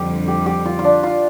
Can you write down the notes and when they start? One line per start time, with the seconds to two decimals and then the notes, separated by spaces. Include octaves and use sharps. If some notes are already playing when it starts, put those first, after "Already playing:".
Already playing: F2 D3 G3 G4
0.28 G4
0.46 G4
0.65 F4
0.79 F4
0.84 D4
1.03 F4